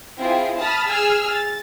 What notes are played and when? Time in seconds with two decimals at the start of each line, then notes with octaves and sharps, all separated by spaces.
0.17 C4 E4 F4 G#4
0.58 A5 B5 D#6 F6 A6
0.87 G#4 G#5 E6 F6
1.30 A6